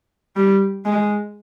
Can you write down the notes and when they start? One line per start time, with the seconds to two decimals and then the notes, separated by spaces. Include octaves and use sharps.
0.36 G3
0.85 G#3